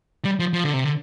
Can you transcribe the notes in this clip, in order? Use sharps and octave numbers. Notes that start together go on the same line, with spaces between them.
G3
F3
F3
D3
C3
D3